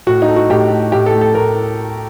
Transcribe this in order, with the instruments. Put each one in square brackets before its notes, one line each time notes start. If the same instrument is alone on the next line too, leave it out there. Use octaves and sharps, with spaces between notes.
[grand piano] A2 F#4
D#4
A3
F#4
A2 G4
A3
A2 G4
A4
A3
A4
A2 A#4